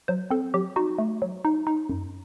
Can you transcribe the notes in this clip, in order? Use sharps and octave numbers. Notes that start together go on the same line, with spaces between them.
F#3 C5
C4 A4
F#3 G4
D#4 F#4
A3
F#3
D#4
D#4
F#2